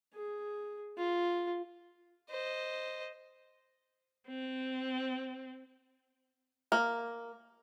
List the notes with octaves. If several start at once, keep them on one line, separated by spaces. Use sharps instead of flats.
G#4
F4
C5 D#5
C4
A#3